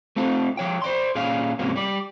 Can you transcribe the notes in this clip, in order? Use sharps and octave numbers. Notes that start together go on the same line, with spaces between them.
A3 C4 F4 A4
F3 C#5 G5
C5 D5 C6
A#2 C#4 G#4 D5 F5
D#2 G#2 C3 F3 A#3 C#4
G3 D5